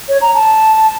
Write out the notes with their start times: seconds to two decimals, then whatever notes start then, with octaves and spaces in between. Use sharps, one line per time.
0.09 C#5
0.21 A#5
0.34 A5